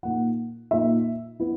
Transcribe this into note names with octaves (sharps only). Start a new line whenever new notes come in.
A#2 A#3 D#4 F#5
A#2 A#3 D#4 E5
B3 E4